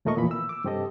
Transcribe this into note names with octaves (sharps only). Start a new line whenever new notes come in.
D#2 A#2 A3 A#4 D#5 C#6
F2 A#2 E3 B5
E6
D6 E6
G2 C3 C4 G4 A4 D#5